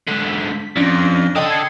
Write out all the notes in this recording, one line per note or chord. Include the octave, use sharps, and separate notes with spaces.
G#2 D3 B6
F2 C#4 D4 A#6
D3 A4 D#5 G5 D#6
G#6 C7 C#7